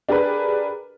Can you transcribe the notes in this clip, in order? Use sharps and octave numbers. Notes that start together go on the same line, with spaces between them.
D4 G4 G#4 A#4 B4